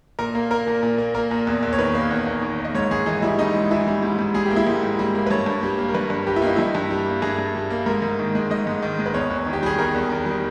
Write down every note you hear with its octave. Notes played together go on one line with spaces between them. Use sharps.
A#2 A#4
A#3
A#3 A#4
A#2
A#2
A#3
A#3 A#4
A#2
E2
E2
C#5
D#3 B4
A#3
E2
E2
D#3
A#3
D#5
G#2 C#5
G#2 G#4
E3 D#4
G3 E4
G#2 D#4
G#2
E3 E4
G3
G#2
G#2
G3 G#4
G4
A#3
E4
G#2
G#2
G3
A#3
B4
G2 C#5
G2
G3
A#3
A#4
G2 B4
G2
G3 G4
E4
A#3 D#4
G2 E4
G2
G3
A#3
G2 G#4
G2
G3
A#3
G#2 A#4
G#2
D#3
G#3
G#2 D#5
G#2
D#3
G#3
B4
E2 C#5
E2
D#3
G4
G3 G#4
E2 A#4
E2
D#3
G3